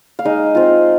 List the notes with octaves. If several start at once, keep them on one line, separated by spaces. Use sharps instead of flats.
F5
G#3 D#4 D#5
C4 F4